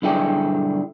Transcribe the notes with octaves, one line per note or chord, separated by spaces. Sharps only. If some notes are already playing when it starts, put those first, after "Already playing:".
B1 G2 D3 E4 G#4 G5